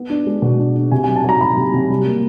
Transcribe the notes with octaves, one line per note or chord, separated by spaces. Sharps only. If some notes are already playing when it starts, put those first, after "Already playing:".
Already playing: B3
D4
G#3
B2
D4
D4
C3 G#5
G#5
F#3
A5
F#3 A#5
F#3 B5
C3
C3
G3
A#3